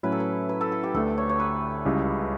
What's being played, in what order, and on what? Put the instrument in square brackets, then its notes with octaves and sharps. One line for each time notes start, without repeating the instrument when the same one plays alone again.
[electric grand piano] A2 F#3 C#4 E4 [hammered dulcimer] B4
[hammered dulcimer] A4
B4
B4
A4
A4
G4
[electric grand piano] D2 D3 A3 D4 [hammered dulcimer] A4
[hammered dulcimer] C#5
C#5
B4
[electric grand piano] C#2 C#3 G3 C#4 E4